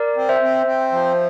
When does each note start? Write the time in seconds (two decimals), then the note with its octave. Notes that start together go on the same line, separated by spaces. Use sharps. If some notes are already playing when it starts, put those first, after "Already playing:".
Already playing: A#4 D5
0.17 C4
0.29 C5 E5
0.41 C4
0.66 C4
0.92 F3